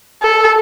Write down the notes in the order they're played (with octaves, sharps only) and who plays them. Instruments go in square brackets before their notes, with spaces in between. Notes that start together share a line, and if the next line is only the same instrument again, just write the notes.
[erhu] A4